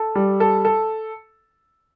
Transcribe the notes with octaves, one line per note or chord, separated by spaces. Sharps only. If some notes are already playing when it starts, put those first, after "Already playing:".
Already playing: A4
G3
A4
A4